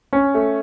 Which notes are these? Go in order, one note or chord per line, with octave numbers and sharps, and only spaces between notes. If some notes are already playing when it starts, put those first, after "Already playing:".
C#4
A3